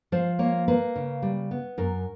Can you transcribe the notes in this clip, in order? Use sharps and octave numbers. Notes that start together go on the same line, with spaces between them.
F3 C5
A#3 C#5
A#3 B4
C#3
G3
B3
F#2 A#4